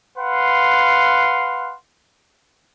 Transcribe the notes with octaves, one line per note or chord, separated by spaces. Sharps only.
B4 F5 F#5 C6